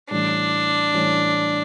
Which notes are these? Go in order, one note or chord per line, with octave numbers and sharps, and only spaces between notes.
A2 E3 G3 C#4 D4
A2 E3 G3 C#4